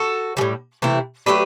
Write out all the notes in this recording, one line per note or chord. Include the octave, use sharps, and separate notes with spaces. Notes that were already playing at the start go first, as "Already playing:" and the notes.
Already playing: F#4 A4
A2 E3 G3
C3 E3 A3 E4
F#3 A3 D4 G4 B4